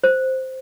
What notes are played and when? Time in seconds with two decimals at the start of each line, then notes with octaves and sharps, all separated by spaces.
0.04 C5